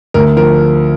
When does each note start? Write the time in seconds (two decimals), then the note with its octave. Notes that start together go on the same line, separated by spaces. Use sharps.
0.14 D2 A#4
0.37 F3 A#4